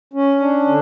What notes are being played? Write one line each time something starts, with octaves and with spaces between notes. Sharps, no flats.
C#4
D4
D3